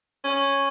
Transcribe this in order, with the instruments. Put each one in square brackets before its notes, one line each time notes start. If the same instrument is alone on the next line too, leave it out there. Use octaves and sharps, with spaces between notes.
[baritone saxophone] C#4